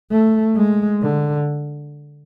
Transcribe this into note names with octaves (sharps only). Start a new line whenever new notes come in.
A3
G#3
D3